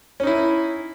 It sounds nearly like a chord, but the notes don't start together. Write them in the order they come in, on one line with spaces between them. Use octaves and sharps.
C#4 D#4 E4